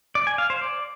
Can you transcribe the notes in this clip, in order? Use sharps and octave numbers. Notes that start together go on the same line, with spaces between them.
D5
G#5
F5
C5
D5